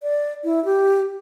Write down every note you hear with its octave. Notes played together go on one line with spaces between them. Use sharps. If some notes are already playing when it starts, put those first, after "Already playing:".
D5
E4
G4